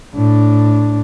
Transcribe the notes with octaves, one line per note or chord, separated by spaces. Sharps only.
A2 D4